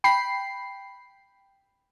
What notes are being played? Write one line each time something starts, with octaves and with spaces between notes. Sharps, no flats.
G5 B5 C7